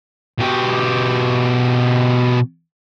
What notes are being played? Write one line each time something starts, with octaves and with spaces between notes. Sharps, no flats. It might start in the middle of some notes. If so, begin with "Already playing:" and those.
B2 G4